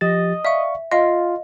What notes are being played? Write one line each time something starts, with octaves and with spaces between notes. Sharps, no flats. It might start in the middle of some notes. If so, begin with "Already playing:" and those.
F3 G4 D#5 A6
D5 E5 F5 C#6
F4 D#5 F5 C6